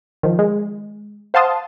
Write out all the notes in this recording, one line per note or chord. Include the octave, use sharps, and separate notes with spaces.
D#3 F3
G#3
C5 F5 F#5 A5 C6 D#6